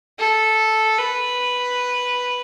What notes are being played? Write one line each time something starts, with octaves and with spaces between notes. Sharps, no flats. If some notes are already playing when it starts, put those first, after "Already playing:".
A4
B4